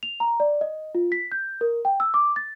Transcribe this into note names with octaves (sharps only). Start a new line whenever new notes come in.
F7
A#5
D5
D#5
F4
B6
G6
A#4
G5
E6
D6
A6